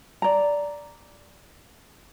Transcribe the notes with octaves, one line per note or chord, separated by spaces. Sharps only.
D5 A#5